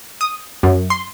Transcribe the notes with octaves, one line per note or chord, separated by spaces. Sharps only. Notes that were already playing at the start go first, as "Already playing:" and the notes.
D#6
F#2
C6